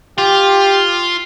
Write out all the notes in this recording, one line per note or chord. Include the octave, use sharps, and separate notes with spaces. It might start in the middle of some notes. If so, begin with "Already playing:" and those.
F4 G4